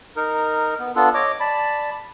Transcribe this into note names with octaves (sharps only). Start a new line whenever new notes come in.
D#4 A#4
B3
B3 D4 F4 A4
C#5 D#5 D6
D5 A5 B5